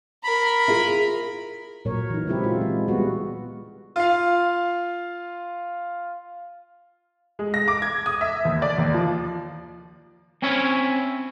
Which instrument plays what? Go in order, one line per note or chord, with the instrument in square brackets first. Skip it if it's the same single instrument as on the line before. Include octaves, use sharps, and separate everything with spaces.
[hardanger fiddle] A#4 [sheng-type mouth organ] B5
[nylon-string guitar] E4 F4 G#4
[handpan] A#2 F#3 A#4 C#5
E3 D#4
C#3 F#3 G#3 C4 E4 G4
F4
G#3
G3 B3 F#4
[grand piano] F4 F5
[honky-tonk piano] G#3
A#6
D6
G#6
D#6
E5
D#2
D5
D#2
F3
[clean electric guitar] C4 C#4 E4 C#5